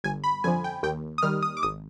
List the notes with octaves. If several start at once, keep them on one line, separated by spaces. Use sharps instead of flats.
G1 G#5
B5
F2 D3 F3 G#5
G5
D#2 G5
D#6
D#3 G3 F6
D#6
D6
G#1 D#6